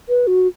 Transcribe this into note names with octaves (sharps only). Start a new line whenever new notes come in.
B4
F#4